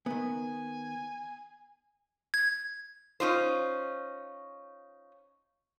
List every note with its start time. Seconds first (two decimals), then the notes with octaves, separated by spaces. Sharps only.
0.06 D#3 B3 G#5
2.34 G#6
3.20 C#4 D#4 F4 C5